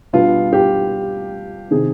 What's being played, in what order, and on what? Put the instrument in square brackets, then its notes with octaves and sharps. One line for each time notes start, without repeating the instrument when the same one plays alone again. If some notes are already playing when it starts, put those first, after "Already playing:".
[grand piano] B2 G3 B3 D4 F4
G4
C3 D#3 G#4